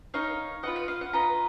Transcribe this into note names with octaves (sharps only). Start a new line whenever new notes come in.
D#4 A#4 C#5 F5
F4 B4 D#5 F#5
F5
F5
F#5
F4 B4 D#5 A#5